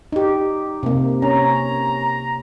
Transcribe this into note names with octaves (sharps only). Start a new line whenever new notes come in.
D#4 G4
C3 A#3
C#4 A#5